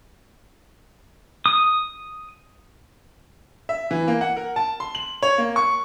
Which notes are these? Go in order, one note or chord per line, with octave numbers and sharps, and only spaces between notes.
D#6
E5
E3
A#3
F#5
A#4
A5
C6
F#7
C#5
A#3
C#6